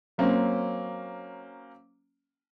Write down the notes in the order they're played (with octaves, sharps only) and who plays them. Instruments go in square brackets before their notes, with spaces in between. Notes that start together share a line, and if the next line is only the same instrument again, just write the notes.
[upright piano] F#3 A#3 C4 C#4